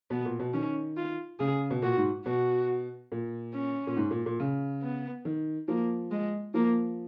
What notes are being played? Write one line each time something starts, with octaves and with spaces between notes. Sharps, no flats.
B2 B3
A#2
B2
D#3 C#4
F4
C#3 G#4
B2
A#2 F#4
G#2
B2 F#4
A#2
C#4
A#2
G#2
A#2
A#2
C#3
B3
D#3
F3 A#3
G#3
F3 A#3